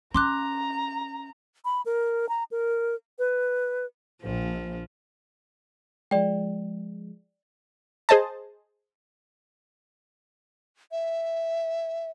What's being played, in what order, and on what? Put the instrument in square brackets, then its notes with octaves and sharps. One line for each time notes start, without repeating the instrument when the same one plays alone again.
[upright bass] C#4 [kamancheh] A#5 [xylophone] C6 D6 F#6
[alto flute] B5
A#4
A#5
A#4
B4
[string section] A#1 [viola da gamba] F3
[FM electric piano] F3 G#3 [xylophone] D5 G5
[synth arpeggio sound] G#4 C5 D#5 A5
[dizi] E5